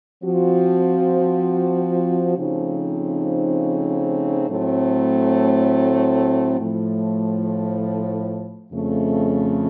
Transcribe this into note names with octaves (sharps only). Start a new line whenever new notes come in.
F3 C4 F#4
C#3 F3 A3 C4 D#4
A2 F#3 A3 C4
A2 F3 A3
F2 C#3 A3